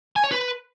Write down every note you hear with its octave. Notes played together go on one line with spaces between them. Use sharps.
G#5
C#5
B4